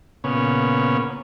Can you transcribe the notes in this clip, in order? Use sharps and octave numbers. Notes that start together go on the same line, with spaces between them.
A#2 C#3 B3 C#4